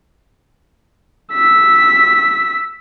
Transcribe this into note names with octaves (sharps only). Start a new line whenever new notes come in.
E6 B6